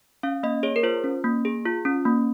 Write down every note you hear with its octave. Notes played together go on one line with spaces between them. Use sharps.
C#4 F5
A#3 D#5
G#4 C#5
A#4
F4 C5
C#4
A#3
G#4
F4
C#4
A#3